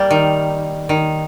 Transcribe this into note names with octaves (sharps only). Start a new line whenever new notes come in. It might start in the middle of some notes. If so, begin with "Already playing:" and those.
Already playing: G3 A#3
D#3
D#3